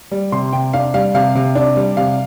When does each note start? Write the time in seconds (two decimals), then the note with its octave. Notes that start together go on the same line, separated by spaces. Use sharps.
0.12 G3
0.32 C3 C6
0.52 C3 G5
0.73 D4 F5
0.94 G3 F5
1.15 C3 F5
1.35 C3
1.55 D4
1.76 G3
1.97 C3 F5